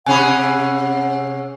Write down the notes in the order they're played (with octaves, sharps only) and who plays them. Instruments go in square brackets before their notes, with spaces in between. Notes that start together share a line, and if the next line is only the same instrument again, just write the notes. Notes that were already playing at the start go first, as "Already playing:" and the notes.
[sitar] C3 C#4 G#4 [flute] F#5 [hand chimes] G#5 B5